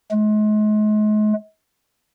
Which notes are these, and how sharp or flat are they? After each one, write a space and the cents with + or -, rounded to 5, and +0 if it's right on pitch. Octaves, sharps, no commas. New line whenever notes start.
G#3 +40